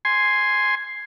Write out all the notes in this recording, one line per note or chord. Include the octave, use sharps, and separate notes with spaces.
G#5 C6